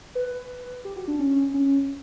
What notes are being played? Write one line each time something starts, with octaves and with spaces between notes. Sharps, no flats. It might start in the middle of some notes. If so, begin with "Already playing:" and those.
B4
G4
F#4
D4
C#4
C#4